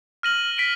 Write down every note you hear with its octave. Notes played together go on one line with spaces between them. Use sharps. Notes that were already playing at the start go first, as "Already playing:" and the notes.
F6 A#6 D#7 F#7
B6 D7 F#7